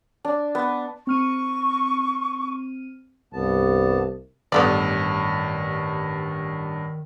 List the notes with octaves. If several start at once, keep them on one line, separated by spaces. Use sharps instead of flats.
D4
B3
C4 C#6 F6 D#7
C2 G2 B3 A5
A1 G2 D#3 B3 A4 D5